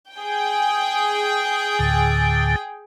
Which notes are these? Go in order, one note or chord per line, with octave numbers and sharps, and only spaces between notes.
G#4 G5
D2 A2 D3